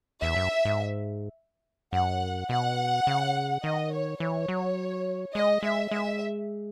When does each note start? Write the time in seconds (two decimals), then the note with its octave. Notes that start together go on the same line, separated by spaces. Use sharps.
0.21 E2 E5
0.36 F#2
0.65 G#2
1.93 F#2 F#5
2.49 B2 F#5
3.07 C#3
3.63 D#3 D#5
3.92 C#5
4.20 E3 C#5
4.48 F#3
5.35 G#3 D#5
5.63 G#3 E5
5.91 G#3 E5